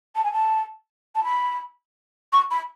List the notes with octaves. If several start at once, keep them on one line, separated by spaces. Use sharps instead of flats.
A5
G#5
A5
A5
B5
C#6
B5